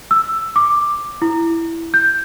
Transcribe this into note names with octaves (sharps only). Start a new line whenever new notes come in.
E6
D6
E4
G6